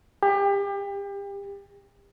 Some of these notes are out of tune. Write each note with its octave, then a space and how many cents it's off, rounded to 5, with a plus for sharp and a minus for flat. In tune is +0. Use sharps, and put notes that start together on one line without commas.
G4 +30